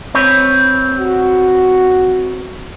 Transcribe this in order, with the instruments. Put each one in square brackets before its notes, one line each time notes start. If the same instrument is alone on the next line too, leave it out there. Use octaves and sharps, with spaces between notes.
[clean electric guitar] C4 B4 C#5
[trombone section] F#4